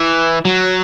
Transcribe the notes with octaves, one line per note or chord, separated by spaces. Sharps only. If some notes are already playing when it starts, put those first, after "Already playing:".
Already playing: E3
F#3